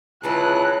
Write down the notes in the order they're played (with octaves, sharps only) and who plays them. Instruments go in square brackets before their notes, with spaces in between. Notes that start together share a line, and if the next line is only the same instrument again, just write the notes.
[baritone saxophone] C#2 [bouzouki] D3 F#3 C#4 [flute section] E4 B4 A5 [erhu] F#6